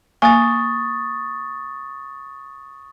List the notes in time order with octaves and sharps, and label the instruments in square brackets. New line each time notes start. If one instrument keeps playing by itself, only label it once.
[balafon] A#3 G#5 [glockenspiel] C#6 D#6 A6